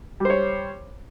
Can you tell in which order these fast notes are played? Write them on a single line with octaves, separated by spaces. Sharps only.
G3 C5 C#5